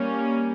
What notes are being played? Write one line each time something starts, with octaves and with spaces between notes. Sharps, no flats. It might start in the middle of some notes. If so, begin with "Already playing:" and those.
Already playing: G3 A#3 C#4